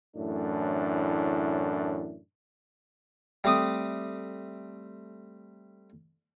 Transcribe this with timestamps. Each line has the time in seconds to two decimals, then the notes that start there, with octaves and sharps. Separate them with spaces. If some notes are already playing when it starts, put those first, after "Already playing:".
0.16 F#2 A2 E3 A3 D4
3.44 G3 A3 C4 D6 D#6